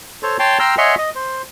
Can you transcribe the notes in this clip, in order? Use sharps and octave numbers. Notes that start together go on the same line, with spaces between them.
A4 C5 C#5
C#5 G5 A5 C6
G5 A#5 C6 E6 F6
C#5 D#5 E5 F#5 G#5 C6
D#5
C5